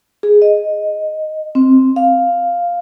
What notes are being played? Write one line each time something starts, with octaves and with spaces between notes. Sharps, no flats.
G#4
D#5
C4
F5